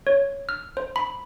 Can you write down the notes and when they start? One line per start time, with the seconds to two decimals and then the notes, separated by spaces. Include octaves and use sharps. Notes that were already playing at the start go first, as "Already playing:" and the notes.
0.07 C#5
0.49 F6
0.77 C5
0.96 B5